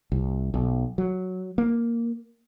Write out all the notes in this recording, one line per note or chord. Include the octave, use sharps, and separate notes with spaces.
C2
B1
F#3
A#3